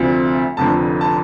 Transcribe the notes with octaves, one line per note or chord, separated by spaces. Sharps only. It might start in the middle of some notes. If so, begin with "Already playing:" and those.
Already playing: D2 C3 F3 C4 F4
F1 F2 D3 F3 A5
A5